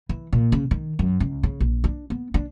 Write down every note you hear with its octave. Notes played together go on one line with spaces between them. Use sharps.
E3
A#2
C#3
D#3
F#2
C#2
C#3
A#1
D4
B3
D4